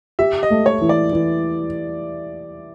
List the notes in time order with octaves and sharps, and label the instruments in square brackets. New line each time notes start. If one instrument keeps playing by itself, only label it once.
[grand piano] G4 [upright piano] E5
[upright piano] D#5
[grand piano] A3
[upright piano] C#5
[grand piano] E3
[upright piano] D5
[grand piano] E3